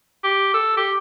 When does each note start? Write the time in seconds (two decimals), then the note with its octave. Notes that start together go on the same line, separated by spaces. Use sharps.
0.24 G4
0.54 A4
0.77 G4